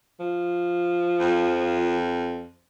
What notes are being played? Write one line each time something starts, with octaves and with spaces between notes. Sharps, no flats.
F3
F2